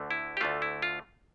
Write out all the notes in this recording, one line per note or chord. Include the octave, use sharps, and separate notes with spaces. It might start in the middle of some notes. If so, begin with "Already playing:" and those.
Already playing: D2 D3 A3
E4
G4
D2 D3 A3 F4
E4
F4